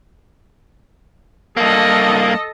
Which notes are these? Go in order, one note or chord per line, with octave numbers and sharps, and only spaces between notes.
G2 A#3 A4 D#5